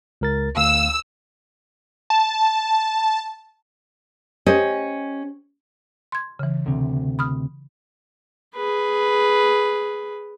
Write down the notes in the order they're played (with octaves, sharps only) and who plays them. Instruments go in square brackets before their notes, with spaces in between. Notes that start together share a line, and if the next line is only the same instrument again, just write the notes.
[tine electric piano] C#2 A#4 A6
[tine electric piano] D2 F5 [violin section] E6
[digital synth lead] A5
[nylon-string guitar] C#4 G4 C5 D#5
[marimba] C6 G#6
C#3 E3
[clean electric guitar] D2 C3
[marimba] B5 D#6 F6
[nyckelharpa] G#4 B4